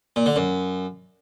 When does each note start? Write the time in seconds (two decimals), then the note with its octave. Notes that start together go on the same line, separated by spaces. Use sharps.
0.16 A#2
0.26 D3
0.36 F#2